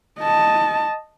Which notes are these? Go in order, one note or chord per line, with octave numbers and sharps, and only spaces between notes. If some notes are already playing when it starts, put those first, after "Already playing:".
D#5 A5